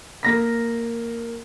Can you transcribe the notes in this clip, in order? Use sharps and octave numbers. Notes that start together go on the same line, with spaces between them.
A#3 A#6 B6